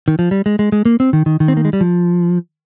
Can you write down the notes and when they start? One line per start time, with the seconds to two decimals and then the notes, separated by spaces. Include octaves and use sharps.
0.08 D#3
0.19 F3
0.31 G3
0.46 G#3
0.59 G#3
0.72 G#3
0.85 A#3
1.00 C4
1.13 D#3
1.26 D#3
1.40 D#3
1.48 C4
1.57 A#3
1.65 G#3
1.73 G3
1.81 F3